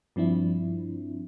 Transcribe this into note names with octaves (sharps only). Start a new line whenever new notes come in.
G2 F3 C4 D4 E4